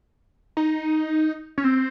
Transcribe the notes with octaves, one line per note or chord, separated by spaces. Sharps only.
D#4
C#4
C4